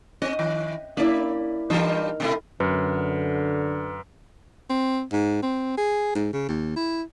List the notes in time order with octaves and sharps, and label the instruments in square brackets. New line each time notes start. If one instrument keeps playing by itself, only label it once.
[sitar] C4 [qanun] D#5
[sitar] D#3
[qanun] A#3 E4 [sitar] C#4 D5
[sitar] G2 E3 G3 [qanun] D#4 A#4
[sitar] B2 A3 E4
[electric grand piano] F#2 [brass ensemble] D3 [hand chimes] B4
[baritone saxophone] C4
G#2
C4
G#4
G#2
C#3
D#2
E4